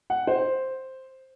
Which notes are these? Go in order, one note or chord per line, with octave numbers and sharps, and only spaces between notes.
F#5
C5